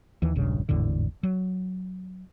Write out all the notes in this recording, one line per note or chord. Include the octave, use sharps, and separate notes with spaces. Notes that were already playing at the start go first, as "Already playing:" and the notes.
D#2 E3
E1 A#1 G2 C#3
G#1 E2 A2 D3
F#3